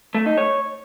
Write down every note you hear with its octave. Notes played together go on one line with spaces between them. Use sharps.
A3
D#4
C#5